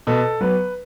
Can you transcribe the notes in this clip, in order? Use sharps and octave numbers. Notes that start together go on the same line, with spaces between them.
B2 A4
F#3 B3 B4